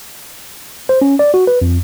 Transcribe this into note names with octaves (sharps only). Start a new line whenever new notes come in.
C5
C#4
D5
F#4
B4
F2